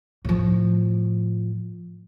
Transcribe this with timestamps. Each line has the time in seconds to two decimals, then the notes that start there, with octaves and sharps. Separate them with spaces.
0.25 A2 F3